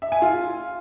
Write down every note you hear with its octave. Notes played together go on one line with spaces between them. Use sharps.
E5
G#5
F4